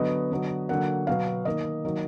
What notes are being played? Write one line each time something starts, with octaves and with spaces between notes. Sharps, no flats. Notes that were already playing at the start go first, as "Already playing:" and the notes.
Already playing: D3 F#3 B3 D#5
D3 F#3 B3
D3 F#3 A#3 F#5
B2 F#3 B3 F5
D#3 A#3 D#5
D#3 F#3 A#3